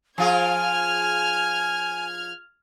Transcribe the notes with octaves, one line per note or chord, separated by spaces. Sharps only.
F3 F4 G#4 G#5 F6 G#6